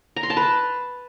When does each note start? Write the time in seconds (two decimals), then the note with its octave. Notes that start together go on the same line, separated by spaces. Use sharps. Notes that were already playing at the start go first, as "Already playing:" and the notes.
0.16 A#5
0.23 C6
0.30 A5
0.37 B4